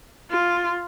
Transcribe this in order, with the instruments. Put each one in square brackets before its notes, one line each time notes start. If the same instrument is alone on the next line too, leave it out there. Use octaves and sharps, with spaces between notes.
[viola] F4